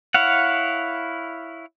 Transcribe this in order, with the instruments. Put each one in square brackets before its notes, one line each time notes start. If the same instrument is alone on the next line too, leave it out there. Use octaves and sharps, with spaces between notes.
[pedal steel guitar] E4 C#5 F5 F#5